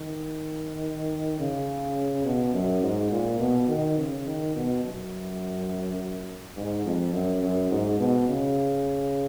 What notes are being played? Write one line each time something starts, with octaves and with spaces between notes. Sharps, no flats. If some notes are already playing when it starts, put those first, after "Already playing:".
Already playing: D#3
C#3
B2
F#2
G#2
A#2
B2
D#3
C#3
D#3
B2
F#2
G#2
F2
F#2
F#2
G#2
B2
C#3